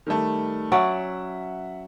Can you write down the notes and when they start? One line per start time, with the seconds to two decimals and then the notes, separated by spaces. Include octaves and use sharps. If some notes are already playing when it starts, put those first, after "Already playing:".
0.07 D#3 G3 A3
0.72 F#3 C#4 D5 E5 F#5